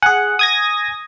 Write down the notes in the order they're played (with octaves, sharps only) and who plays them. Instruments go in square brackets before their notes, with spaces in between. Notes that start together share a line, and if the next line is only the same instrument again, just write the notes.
[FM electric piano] G#4 F#5 [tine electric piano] G#5
[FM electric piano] D#6 G#6 A#6